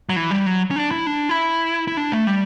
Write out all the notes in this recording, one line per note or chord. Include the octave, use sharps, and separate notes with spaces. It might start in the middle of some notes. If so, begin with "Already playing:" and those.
F#3
E3
G3
F#3
C#4
D4
E4
D4
E4
E4
D4
A3
G3